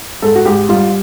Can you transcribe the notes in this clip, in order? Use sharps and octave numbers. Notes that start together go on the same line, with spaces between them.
G#2 A4
F#4
G#2 G4
G3 F4